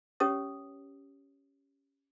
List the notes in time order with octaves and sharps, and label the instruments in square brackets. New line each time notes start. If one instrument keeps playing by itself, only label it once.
[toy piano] C#4 G4 B4 C#5 D#6